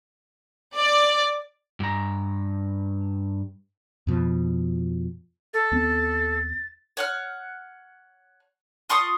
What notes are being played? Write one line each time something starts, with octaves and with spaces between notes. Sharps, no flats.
D5
G2 A#5
F2 B2 F3
A4 A6
D#2 B3 C4
C#5 F#5 F6
F4 C6 C#6 D#6